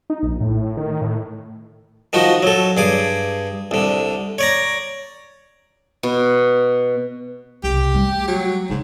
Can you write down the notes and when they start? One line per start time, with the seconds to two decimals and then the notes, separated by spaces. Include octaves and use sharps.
0.10 D#4
0.23 A#1
0.41 A2
0.77 D#3
1.01 A2
2.13 D#3 F3 D#4 F#4
2.43 F#3 A4
2.77 G2 G#4 D6
3.71 C2 D3
4.38 C#5 D5 A#5
6.03 B2
7.64 C2 C#3 G4
7.94 G3 A3
8.28 F#3
8.70 G#2 C#3 F#3